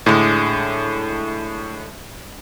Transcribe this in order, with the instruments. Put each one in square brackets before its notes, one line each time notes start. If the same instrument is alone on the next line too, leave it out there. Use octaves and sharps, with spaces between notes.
[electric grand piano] A2 [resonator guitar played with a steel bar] D3 G#3